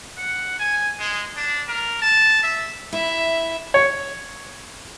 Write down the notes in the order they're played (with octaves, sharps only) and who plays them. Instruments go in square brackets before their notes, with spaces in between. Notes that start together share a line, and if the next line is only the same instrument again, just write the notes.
[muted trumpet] F#5
G#5
G#3
D4
A#4
A5
E5
[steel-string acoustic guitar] E4 [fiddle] E5
[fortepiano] C#5